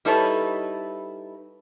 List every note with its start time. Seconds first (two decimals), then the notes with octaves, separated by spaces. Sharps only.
0.05 G3 D#4 E4 A4 B4 C#5